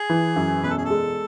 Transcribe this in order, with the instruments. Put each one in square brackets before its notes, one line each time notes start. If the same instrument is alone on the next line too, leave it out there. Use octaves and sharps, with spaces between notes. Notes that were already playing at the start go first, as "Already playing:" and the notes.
Already playing: [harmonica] G#4
[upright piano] E3
F#2
[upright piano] E1 [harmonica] B4
[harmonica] A4
G#4
A4
[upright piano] G#3